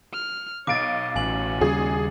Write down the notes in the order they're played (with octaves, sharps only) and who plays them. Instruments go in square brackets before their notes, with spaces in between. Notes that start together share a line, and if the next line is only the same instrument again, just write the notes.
[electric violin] F6
[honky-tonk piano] B1 F5 D7 [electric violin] C#5 D#5 [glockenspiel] D6 A6
[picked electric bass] A1 [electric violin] C#4 F#4 [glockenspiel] G#5 F#7
[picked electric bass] D#2 C#3 G3 [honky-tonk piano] G#4